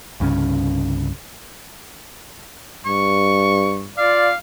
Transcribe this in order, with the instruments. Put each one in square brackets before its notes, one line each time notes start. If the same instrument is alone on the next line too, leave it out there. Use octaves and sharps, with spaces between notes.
[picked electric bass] C2 G2 C#3 C#4
[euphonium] G2 [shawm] C#6
[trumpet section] F4 D5 [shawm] F5